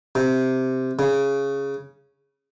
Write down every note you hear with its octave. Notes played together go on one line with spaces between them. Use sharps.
C3
C#3